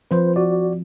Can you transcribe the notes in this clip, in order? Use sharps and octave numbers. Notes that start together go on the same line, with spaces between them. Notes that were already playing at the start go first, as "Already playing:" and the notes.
F3 C4 B4 C5
F#4 D5